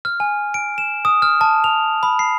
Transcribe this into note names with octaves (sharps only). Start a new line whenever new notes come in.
F6
G#5
D7
E7
D#6
F6
A5
F7
B5
C7